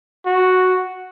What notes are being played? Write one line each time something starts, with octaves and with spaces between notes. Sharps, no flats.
F#4